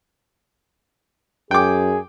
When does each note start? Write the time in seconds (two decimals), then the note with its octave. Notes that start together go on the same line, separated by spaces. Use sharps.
1.51 F#2 G#4 G5 D6